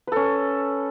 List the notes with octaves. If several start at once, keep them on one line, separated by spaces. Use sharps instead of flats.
C#4 A4 B4